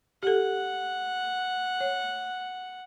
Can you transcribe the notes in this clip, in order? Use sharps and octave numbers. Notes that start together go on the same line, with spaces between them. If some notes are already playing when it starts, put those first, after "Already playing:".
G4 A4 F#5
C#5